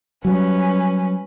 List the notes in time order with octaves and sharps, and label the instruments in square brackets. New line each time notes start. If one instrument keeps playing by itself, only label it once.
[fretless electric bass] F#3 G3 [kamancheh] C#4 B4